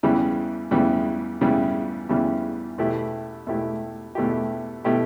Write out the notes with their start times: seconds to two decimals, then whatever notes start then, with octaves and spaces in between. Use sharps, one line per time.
0.03 E2 C#3 E3 G3
0.71 E2 C#3 E3 G3
1.41 E2 C#3 E3 G3
2.09 E2 C#3 E3 G3
2.78 E2 B2 A3 E4 G4
3.47 E2 B2 A3 E4 G4
4.15 E2 B2 A3 E4 G4
4.84 B2 A3 E4 G4